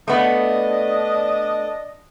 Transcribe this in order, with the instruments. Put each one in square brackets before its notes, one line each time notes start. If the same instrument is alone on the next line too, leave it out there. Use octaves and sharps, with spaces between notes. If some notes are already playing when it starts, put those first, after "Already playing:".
[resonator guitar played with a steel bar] A3 B3 [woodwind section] D4 D#5